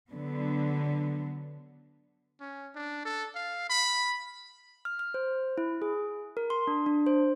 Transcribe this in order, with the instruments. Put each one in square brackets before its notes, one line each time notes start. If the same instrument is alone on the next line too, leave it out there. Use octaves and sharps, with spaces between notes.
[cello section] D3 F#3 B3
[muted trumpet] C#4
D4
A4
F5
B5
[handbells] F6
F6
C5
E4
G#4
A#4
C6
D4
D4
C5